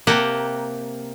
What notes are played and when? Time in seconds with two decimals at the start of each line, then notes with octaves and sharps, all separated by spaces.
0.07 C3 A#3 G4 F#5 A5 A#5